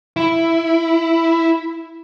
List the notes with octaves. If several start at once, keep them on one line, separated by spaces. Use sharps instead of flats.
E4